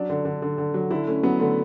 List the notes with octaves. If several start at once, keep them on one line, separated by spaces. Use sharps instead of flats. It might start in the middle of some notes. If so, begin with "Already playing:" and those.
Already playing: F#3 D4
D3
D3
D3
D3
F#3
D3 E4
A3 C#4
F#3 B3
D3 A3